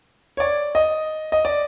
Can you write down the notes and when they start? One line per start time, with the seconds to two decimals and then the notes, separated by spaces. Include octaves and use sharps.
0.37 C#5
0.40 D5
0.75 D#5
1.32 D#5
1.45 D5